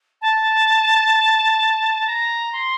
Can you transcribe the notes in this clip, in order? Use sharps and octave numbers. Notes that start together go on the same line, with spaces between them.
A5
A#5
C6